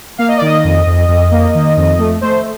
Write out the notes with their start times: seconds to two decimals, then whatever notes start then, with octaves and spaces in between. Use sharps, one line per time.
0.18 A#3 F5
0.28 D#5
0.37 D5
0.41 D#3 D#5
0.64 F2
0.87 F2
1.08 F2
1.31 A#3
1.55 D#3
1.77 F2
1.99 A3
2.21 A3 C5